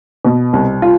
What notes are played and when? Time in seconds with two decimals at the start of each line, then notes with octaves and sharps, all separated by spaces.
0.25 B2
0.53 C2
0.82 F4